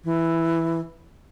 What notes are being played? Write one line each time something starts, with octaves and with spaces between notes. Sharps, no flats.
E3